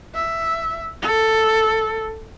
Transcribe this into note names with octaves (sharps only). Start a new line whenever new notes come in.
E5
A4